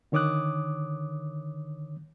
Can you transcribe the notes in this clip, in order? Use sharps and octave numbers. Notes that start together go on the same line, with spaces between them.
D3 D#3 C#5 D6 D#6 F#6